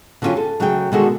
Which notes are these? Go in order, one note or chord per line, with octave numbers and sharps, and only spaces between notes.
D3 F#3 G3 C#4 F4 G4
A4
C#3 F#3 A3 G#4 F#5 G5
B2 D3 D#3 G#3 F#4 A4